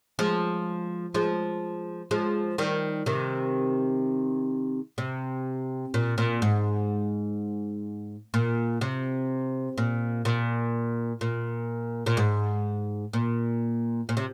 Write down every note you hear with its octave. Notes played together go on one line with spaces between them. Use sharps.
F3 G#3
F3 G#3
F3 G#3
D#3 G3
C3 D#3
C3
A#2
A#2
G#2
A#2
C3
A#2
A#2
A#2
A#2
G#2
A#2
A#2
C3